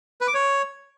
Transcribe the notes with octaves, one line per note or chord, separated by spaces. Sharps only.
B4
D6
C#5